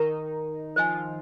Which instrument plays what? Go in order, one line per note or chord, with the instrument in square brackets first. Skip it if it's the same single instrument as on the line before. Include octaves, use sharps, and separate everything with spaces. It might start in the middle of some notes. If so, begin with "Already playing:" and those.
Already playing: [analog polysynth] D#3 D#4 [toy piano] A#4 A#5 C#6
[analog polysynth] F3 F4 [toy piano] C5 D#5 G#5